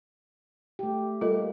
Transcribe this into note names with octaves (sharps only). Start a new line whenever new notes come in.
A3 G4
G3 A#3 F4 A4 D#5